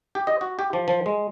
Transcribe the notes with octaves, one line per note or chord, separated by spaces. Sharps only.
G4
D#5
F#4
G4
F3
F3
G#3